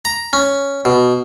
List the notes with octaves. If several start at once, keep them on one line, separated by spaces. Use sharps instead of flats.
A#5
C#4
B2